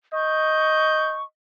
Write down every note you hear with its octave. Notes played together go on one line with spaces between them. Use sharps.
D#5 C#6 G6